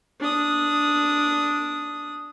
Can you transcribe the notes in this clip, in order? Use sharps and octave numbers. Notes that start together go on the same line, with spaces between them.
D4 D#6